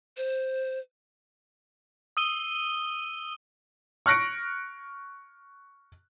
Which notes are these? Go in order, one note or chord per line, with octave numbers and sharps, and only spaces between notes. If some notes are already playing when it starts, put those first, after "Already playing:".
C5
D#6 E6 D#7 G7
C#6 F6 F#6 A#6 C#7 D7